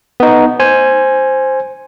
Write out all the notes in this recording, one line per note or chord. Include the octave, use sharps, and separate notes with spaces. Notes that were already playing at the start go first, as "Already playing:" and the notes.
B3 D#4
C5 G#5